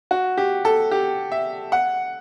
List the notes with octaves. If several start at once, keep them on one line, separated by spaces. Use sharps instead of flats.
F#4
G4
A4
G4
E5
F#5